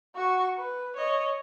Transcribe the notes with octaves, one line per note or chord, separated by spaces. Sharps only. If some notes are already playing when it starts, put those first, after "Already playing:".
F#4 C#6
B4
C#5 D#5